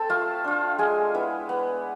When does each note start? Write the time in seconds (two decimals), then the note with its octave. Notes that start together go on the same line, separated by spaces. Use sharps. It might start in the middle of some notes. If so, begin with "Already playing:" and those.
Already playing: C4 A4 A5
0.10 A3 F4 F5
0.44 D4 F4
0.78 G#3 G#4 G#5
1.14 B3 E4
1.49 B3